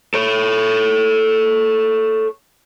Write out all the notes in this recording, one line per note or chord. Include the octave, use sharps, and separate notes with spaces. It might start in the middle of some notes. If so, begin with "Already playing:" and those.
A4 C#5